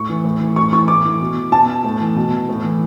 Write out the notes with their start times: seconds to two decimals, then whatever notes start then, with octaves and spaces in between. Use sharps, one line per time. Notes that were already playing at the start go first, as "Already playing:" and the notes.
Already playing: A2 C#6
0.09 E3
0.24 A2
0.40 E3
0.56 A2 C#6
0.72 E3 C#6
0.88 A2 D6
1.05 E3
1.21 B2
1.52 B2 A5
1.84 A2
2.01 E3
2.16 B2
2.49 A2
2.64 E3